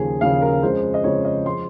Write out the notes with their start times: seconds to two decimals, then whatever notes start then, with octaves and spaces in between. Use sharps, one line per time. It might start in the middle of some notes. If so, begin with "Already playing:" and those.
Already playing: D#2 C#3 F3 G#4
0.21 D#2 C#3 F3 F5
0.42 A#4
0.63 F2 C#3 G#3 C5
0.94 D#5
1.04 F2 C#3 G#3 C#5
1.25 D#5
1.45 F3 G#3 C6